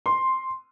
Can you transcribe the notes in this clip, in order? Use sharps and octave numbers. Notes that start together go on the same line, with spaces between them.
C6